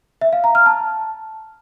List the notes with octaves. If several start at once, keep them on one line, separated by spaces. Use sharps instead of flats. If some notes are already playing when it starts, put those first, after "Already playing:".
E5
F5
A#5
F6
A5